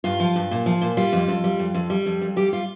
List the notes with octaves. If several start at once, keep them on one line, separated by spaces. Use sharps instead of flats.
G2 F4
F3
G2
A#2
F3
A#2
G3 F4
F2
F2
G3
F2
F2
G3
F2
F2
G3 G4
F4